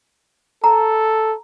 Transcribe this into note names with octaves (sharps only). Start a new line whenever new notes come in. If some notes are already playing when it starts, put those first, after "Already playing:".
A4 A#5